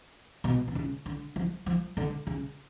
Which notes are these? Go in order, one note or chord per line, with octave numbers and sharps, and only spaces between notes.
B2
B2
C#3
D3
F3
F3
D3
C#3